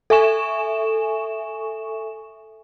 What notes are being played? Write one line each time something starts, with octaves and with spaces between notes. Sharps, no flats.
A4 E5 G#5 C#6 E7